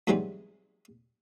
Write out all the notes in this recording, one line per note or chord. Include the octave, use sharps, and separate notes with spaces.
G#2 B2 E3 F#3 G3 C4